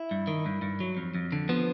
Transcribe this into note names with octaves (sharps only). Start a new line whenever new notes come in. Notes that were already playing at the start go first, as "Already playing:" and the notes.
Already playing: E4
G2
D#3
G2
G2
F#3
F2
F2
D3
F3 B3